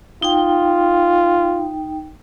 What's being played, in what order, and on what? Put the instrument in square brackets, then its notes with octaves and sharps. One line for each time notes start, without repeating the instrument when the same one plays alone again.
[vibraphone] D#4 G5 [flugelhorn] F4